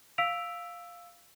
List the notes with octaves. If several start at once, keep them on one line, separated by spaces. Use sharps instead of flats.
F5 E6 B6 D7 F7